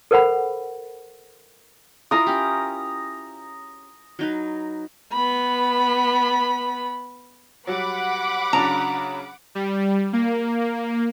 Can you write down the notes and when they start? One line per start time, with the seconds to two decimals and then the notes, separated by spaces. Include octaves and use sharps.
0.11 A4 A#4 C5 F#5 B5
2.11 E4 F4 A#4 A#5 D#6
2.27 C#4 G4
4.19 F#3 D#4 B4
5.13 B3 B5
7.67 F#3 G3 F#5 B5 D6
8.53 C#3 F#3 D4 A#5
9.55 G3
10.13 A#3